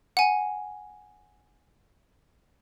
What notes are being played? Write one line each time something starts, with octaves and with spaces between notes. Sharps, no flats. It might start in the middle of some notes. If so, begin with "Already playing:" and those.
F#5 G#5